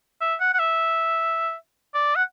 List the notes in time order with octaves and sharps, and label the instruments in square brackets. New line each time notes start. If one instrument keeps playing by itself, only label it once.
[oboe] E5
F#5
F#5
E5
D5
F#5